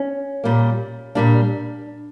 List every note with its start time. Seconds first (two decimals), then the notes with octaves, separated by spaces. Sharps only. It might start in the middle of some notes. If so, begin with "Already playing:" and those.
Already playing: C#4
0.44 A#2 G3 A#3
1.15 A#2 G3 A#3 D4